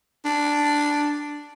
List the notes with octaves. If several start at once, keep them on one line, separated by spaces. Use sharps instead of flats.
D4